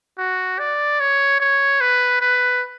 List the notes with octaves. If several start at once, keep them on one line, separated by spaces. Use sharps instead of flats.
F#4
D5
C#5
C#5
B4
B4